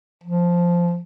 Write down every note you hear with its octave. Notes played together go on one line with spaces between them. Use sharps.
F3